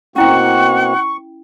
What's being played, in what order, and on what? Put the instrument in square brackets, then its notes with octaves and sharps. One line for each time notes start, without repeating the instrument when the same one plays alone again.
[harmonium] B2 A#3 C4 [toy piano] C#4 E4 G5 [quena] F#5 [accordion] C#6